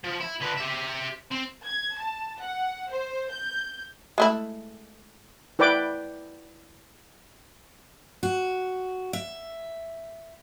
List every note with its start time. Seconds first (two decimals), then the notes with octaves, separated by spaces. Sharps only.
0.04 F3
0.20 E4
0.41 D3 B4
0.57 G4 E5
1.32 C4
1.66 G#6
1.98 A5
2.42 F#5
2.91 C5
3.31 G6
4.18 G#3 A3 E4
5.59 E4 B4 D5 G5 D6
8.23 F#4
9.13 E5